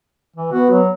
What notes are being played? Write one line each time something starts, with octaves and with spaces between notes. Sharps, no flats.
E3
B3 F#4
F#3